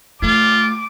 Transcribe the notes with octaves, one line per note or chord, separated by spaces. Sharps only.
A3 F4 D6